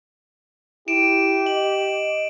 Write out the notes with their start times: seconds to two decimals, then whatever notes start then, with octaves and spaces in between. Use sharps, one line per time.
0.88 E4 G4 D7 E7
1.46 D#5 F#7